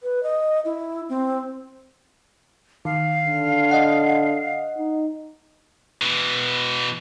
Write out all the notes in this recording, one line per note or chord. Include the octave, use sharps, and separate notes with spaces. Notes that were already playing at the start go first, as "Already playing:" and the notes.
B4
D#5
E4
C4
D#3 F5
D3
D#5 F#5
D#4
B2 E3